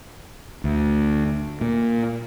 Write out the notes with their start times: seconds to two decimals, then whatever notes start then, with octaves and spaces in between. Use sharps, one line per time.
0.64 D2
1.61 A#2